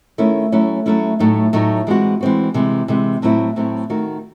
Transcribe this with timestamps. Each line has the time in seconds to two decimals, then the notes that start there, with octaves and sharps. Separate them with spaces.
0.18 D#3 A3 C#4 E4
0.52 F#3 A3 C#4 E4
0.86 F#3 A3 C#4 E4
1.19 A2 F#3 A3 D#4
1.53 A2 F#3 A3 D#4
1.87 E3 G#3 C4 F#4
2.21 E3 G#3 C4 F#4
2.54 C3 E3 G#3
2.88 C3 E3 G#3
3.22 A2 F#3 A3 C4 E4
3.56 A2 F#3 A3 C4 E4
3.90 D#3 A3 D#4 F#4